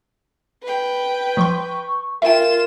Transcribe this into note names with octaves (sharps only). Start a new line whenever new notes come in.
B4 G5
F3 C6 C#6
F4 A#4 E5 G5 E7